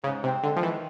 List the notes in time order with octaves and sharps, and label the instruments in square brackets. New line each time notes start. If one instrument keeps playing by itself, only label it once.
[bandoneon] G#2 [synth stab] C#3
[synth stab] C3 [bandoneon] C4
[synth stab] D3 [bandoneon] G#3
[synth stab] F3
[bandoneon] D#3 [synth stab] E3